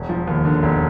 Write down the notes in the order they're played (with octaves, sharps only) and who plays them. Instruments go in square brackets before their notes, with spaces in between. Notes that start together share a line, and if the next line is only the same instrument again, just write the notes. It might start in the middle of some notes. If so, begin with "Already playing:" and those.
Already playing: [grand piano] E1
F3
D#2
D3
E1